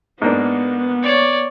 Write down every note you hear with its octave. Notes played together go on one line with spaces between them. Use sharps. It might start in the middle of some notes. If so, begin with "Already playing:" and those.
G#2 A#3 B3 D4
C#5 D5